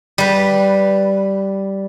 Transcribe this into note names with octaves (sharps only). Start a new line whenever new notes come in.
G3 B4